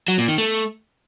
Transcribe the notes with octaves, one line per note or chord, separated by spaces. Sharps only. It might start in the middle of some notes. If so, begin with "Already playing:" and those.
F#3
A#2
D#3
A3